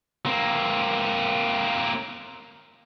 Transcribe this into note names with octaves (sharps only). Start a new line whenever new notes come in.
A#3 C4